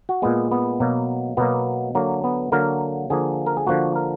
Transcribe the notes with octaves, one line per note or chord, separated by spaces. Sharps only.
F#4
A#2 G#3 B3
B3
B2 F#3 A#3
B2 F#3 A#3 B3
D3 F#3 A#3
B3
D3 F#3 A#3 A#4
D3 F3 A#3 G#4
A#4
G#4
D3 F3 A#3 F#4
A#4